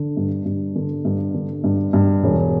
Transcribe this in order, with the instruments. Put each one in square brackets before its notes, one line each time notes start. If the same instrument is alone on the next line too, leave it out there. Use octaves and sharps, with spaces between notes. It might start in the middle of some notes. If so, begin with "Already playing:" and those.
Already playing: [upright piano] D3
G2
G2
D3
G2
D3
G2
G2
E1